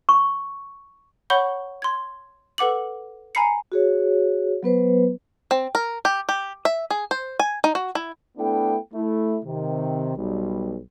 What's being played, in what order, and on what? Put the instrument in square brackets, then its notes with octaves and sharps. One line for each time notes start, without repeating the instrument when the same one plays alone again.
[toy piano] C#6
[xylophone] C#5 F#5 B5 C#6 G6 G7
C6 G#6
A4 B4 F#5 D6 F#7
G#5 A#5 B5 C7 C#7
[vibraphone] F#4 G#4 C#5
F#3 B3 B4 C5
[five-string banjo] C4
A#4
G4
G4
E5
G#4
C5
G#5
D#4
F#4
E4
[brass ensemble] A3 B3 D4 E4 A4 G5
A3 E4
C3 D#3
B1 G3